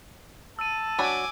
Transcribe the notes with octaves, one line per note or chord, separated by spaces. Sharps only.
A5 E6 D#7
F#3 D4 G#5 B5 D6